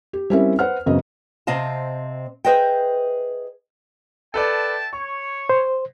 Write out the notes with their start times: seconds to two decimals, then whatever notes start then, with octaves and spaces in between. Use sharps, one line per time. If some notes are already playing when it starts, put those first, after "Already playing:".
0.13 G4
0.30 G3 C4 C#4 E4 A#4 E5
0.59 B4 C5 F#5 F6
0.86 F#2 C#3 B3 C4 D#5
1.47 C3 C4 D#5 F5 A5
2.45 G#4 B4 C5 D#5 E5 G5
4.34 A4 B4 D5 E5 G5 A5
4.93 C#5 C#6
5.49 C5